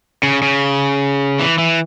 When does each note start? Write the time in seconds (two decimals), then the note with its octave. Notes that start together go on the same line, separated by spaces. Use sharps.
0.23 C#3
0.42 C#3
1.40 E3
1.58 E3